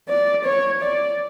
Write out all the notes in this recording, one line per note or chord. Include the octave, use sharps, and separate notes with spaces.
D5
C#5
D5